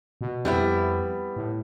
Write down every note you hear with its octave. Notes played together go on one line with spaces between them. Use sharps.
B2
F2 G3 B3 E4
A2